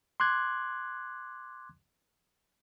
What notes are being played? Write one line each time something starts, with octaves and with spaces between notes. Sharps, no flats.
C6 D6 F#6 G#6